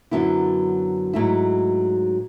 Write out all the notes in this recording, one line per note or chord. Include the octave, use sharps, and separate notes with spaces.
F#2 D3 F#3 B3 E4
G#2 F#3 A3 E4